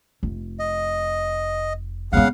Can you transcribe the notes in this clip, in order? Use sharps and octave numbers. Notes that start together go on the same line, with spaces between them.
F1
D#5
C#3 G#3 B3 F5 F#5